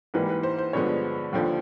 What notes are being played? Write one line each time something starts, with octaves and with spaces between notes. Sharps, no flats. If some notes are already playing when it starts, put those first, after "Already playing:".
G#2 E3 G3 A#3 B4
B4
C5
C5
G2 D3 F3 G#3 B3 C#5
D#2 D3 F3